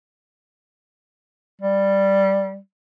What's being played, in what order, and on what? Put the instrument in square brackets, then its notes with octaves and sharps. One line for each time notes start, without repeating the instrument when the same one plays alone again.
[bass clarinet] G3